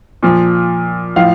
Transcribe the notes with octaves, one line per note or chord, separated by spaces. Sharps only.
A#2 F3
A2 F3 F5